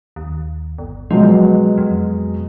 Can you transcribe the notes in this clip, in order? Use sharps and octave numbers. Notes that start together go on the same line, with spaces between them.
D#2
G1
B2 F3 F#3 G#3
F2